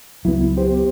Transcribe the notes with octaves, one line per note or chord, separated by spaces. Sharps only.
C#2 F#3 B3 E4
B3 G4 C5